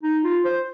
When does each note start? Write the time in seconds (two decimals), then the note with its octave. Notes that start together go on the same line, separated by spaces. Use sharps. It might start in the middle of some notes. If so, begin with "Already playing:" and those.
0.03 D#4
0.24 F4
0.45 C5